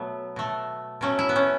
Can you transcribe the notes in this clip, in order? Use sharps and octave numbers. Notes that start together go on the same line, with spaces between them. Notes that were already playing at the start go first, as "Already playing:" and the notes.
Already playing: B2 F#3 A3 B3
B2 A3
B2 F#3 A3 C#4
E4
B3
C#4